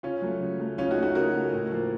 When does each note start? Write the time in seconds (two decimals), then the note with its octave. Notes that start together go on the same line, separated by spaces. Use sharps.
0.03 C#3 C#4 F4
0.22 F#3 A3
0.41 C#3
0.59 F#3 A3
0.78 C#3 C#4 F4
0.91 D#4 F#4
0.96 A3
1.03 D#4 F#4
1.15 C#3 F#4 A#4
1.34 A3
1.52 A2
1.72 F3 A#3